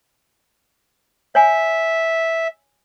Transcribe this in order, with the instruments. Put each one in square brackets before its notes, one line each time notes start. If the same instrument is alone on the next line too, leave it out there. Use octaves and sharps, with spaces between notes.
[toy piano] C#5 G#5 [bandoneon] E5